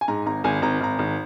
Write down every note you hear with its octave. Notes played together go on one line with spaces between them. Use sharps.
G#5
G#2 A#5
G#1 A#5
G#1 G#5
G#1 A#5
G#1 A#5
G#1